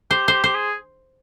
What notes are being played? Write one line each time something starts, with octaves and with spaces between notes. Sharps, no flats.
G4 C5
G4 C5
G4 C5
G#4